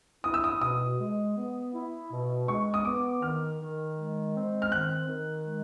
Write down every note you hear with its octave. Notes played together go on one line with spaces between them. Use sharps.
E4 D#6
E6
D#6
B2 D#6
G#3
B3
E4
B2
G#3 C#6
D#6
B3 D6
D#3 F6
D#3
G#3
C4
F6
D#3 F#6
D#3
G#3